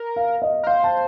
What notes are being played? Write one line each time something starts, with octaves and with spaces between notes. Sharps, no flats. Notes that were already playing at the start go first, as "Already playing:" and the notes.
Already playing: A#4
F5
D#5
A#4
C5 F5
A5